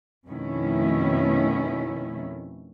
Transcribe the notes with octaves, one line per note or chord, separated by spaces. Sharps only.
F2 B2 D#3 A3 C#4 E4